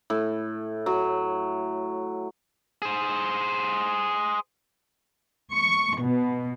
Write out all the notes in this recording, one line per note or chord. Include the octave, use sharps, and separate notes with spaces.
A2
F#3
G#4 C5
C#6
B2